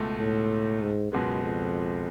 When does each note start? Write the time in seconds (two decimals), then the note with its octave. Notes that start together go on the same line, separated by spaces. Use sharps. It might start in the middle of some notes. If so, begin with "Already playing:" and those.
Already playing: C#2 B2 A3
0.19 A2
0.81 G#2
1.12 C#2 F#2 B2 G#3 B3
1.42 F2